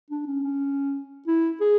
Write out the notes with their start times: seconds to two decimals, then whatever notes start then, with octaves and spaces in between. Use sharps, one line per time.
0.10 D4
0.27 C#4
0.44 C#4
1.27 E4
1.61 G#4